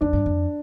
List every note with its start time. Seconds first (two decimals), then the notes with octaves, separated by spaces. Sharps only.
0.01 F2 D4
0.13 G2
0.26 F2